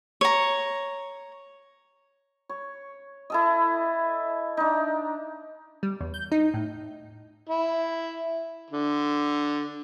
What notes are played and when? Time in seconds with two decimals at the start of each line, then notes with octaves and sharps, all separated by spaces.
0.21 C#5 A#5
2.49 C#5
3.30 E4 A4 D#5
4.57 D4 D#4
5.83 G3
6.01 E2
6.14 G6
6.32 D#4
6.54 A2
7.49 E4
8.70 D3